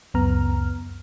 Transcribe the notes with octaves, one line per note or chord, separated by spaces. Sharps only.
C#2 F#2 B3 A#5 F6